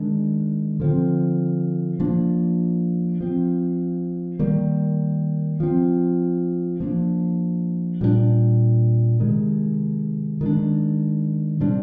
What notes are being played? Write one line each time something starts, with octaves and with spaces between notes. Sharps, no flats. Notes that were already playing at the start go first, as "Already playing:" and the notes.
Already playing: D#3 G#3 D4
D3 F3 C4
F3 A#3 D4
F3 C4
D#3 G3 A#3
F3 C4
F3 A#3 D4
A#2 G3 A#3 D4
C3 D#3 G#3
D#3 G#3 D4
C3 G3 D4